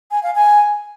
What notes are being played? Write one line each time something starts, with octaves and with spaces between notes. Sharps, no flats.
G#5
F5
G#5